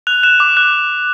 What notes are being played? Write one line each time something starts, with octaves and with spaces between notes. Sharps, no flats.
F#6 F7
F#6 E7
D6 E7
F#6